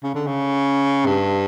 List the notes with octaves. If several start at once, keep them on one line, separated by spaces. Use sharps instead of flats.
C#3
D3
C#3
G2